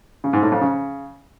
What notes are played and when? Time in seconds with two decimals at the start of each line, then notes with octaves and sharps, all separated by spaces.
0.24 C#3
0.33 G#2
0.43 A2
0.52 F2
0.61 C#3